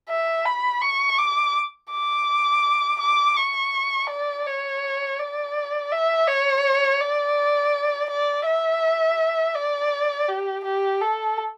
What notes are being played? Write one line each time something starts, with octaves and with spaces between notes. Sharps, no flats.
E5
B5
C#6
D6
D6
D6
C#6
D5
C#5
D5
E5
C#5
D5
D5
E5
D5
G4
G4
A4